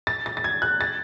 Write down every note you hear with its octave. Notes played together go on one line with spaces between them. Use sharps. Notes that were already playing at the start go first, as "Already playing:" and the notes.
A6
A6
A6
G#6
F#6
A6